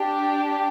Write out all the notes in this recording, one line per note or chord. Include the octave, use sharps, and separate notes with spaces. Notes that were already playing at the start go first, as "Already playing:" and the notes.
Already playing: D4 G4